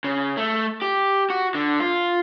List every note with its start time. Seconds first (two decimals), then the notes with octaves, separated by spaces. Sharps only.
0.04 C#3
0.37 A3
0.82 G4
1.30 F#4
1.54 D3
1.80 F4